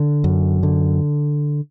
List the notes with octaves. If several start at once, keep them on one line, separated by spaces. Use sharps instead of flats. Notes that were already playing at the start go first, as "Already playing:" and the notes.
Already playing: D3
F#2
D3